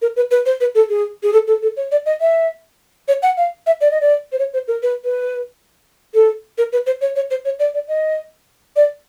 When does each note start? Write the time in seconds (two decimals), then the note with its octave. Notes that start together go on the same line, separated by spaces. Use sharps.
0.02 A#4
0.16 B4
0.31 B4
0.46 C5
0.61 B4
0.75 A4
0.89 G#4
1.23 G#4
1.33 A4
1.47 A4
1.62 A4
1.77 C#5
1.92 D5
2.06 D#5
2.21 E5
3.08 C#5
3.22 F#5
3.37 F5
3.67 E5
3.81 D5
3.91 D#5
4.01 D5
4.32 C5
4.39 C#5
4.54 C5
4.68 A#4
4.83 B4
5.05 B4
6.14 A4
6.58 A#4
6.73 B4
6.86 C5
7.01 C#5
7.16 C#5
7.31 C5
7.45 C#5
7.59 D5
7.74 D5
7.88 D#5
8.76 D5